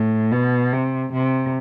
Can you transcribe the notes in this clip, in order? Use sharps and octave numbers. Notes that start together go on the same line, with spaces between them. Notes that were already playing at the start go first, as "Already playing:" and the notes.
Already playing: A2
B2
C3
C3